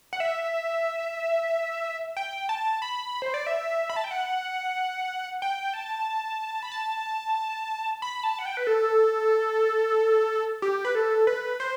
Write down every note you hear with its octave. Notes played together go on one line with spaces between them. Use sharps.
F#5
E5
G5
A5
B5
C5
D5
E5
B5
A5
G5
F#5
G5
A5
B5
A5
B5
A5
F#5
G5
B4
A4
G4
B4
A4
B4
C5